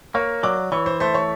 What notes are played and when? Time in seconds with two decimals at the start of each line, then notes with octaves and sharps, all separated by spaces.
0.14 A#3 C#5 C#6
0.43 F#3 D5 D6
0.72 E3 C#5 C#6
0.86 C5 C6
1.00 A3 C5 C6
1.14 C#5 C#6